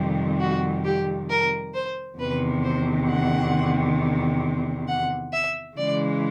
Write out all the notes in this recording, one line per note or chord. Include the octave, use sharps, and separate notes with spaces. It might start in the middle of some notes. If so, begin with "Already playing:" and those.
Already playing: F2 C3 D#3 G3
F#4
G4
A#4
C5
E2 C3 D#3 B4
C5
F#5
F#5
E5
C#3 E3 G#3 D5